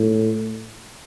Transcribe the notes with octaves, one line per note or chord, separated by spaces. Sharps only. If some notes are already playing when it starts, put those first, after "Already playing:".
Already playing: A2